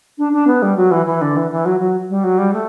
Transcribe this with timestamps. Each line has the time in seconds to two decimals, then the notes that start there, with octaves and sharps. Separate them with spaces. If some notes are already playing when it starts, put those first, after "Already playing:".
0.18 D4
0.33 D4
0.47 B3
0.62 G3
0.76 F#3
0.91 E3
1.06 E3
1.21 D3
1.36 E3
1.51 E3
1.65 F#3
1.80 F#3
2.09 G3
2.23 F#3
2.38 G3
2.53 A3